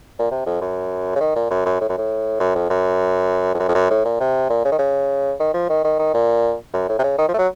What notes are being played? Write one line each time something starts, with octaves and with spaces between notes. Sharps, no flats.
A#2
C3
F2
F#2
C#3
D#3
A#2
F#2
F#2
A2
F#2
A2
F#2
F2
F#2
F2
F#2
F2
F#2
A2
A#2
C3
A#2
C#3
D#3
C#3
D#3
F3
D#3
D#3
D#3
A#2
F#2
A2
C3
C#3
D#3
F3
A3
F#3